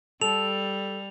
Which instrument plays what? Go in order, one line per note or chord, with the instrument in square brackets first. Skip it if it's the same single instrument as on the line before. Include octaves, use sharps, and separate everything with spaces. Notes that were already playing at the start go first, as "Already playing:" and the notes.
[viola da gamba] G3 [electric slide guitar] A4 [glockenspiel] F7